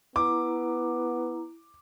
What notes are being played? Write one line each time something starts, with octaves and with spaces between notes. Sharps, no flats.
B3 E4 A#5 D6